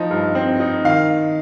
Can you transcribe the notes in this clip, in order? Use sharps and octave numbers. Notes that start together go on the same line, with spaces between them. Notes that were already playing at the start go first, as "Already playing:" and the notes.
Already playing: F3 D#4
G2
C4
D#4
D#3 F5